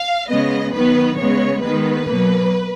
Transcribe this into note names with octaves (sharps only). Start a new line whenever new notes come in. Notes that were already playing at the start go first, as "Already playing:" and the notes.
Already playing: F5
C#3 G#3 B3 D#5
D#3 F#3 B3 B4
C#3 G#3 B3 C#5
D#3 G#3 B3 B4
B2 F#3 A#3